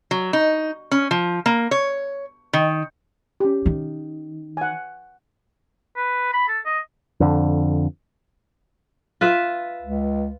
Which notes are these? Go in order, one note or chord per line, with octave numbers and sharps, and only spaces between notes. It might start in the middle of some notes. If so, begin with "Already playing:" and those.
F#3
D#4
C#4
F3
A#3
C#5
D#3
C#4 G4
D#3
F#5 G#5
B4
B5
A4
D#5
F2 D3
F4 B4 E5
C#2